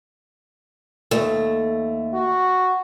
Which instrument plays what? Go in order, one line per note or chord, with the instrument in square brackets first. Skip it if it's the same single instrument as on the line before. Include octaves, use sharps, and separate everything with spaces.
[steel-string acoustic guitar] D#2 A3
[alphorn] F#4